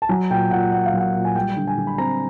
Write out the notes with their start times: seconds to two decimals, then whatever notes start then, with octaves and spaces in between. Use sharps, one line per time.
0.02 A5
0.09 F#3 G#5
0.30 A#2 G5
0.51 A#2 F#5
0.72 A#3 F#5
0.86 F5
0.94 F#3 F#5
1.14 A#2
1.25 G#5
1.35 G3 G5
1.56 D3
1.67 G#5
1.77 D3
1.87 B5
1.98 C4 A#5